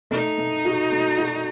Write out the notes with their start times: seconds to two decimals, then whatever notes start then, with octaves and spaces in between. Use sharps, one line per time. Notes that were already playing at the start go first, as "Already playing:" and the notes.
0.11 A3 D#4
0.38 A3
0.65 F#4
0.92 A3
1.18 F#4